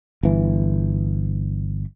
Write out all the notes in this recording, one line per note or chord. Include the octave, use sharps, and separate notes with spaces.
G1 E3